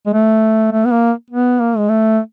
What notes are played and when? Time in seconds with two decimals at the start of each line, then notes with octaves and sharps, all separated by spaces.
0.06 G#3
0.13 A3
0.72 A3
0.85 B3
0.91 A#3
1.31 B3
1.60 A#3
1.77 G#3
1.89 A3